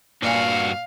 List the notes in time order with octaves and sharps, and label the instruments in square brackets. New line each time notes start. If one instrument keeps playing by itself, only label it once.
[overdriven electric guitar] G2 F#4 [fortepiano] A#2 G#5 [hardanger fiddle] F5